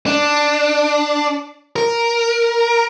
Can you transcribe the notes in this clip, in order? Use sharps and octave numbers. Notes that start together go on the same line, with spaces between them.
D4
A#4